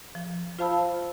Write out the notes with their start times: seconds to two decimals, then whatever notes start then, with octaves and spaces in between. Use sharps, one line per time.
0.15 F3
0.59 F4 C5 F5 A5 B5 E6